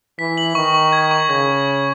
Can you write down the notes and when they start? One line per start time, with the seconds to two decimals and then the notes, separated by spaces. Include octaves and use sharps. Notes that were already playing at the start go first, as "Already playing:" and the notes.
0.19 E3 B6
0.37 F#7
0.55 D#3 C#6
0.74 C#6
0.93 G#6
1.11 C#6
1.29 C#3 G#6